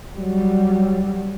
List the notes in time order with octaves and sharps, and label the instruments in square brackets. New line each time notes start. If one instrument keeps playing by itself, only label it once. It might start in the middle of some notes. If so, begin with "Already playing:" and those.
[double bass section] F#3 G3